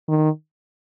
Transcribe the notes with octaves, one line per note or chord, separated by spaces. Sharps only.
D#3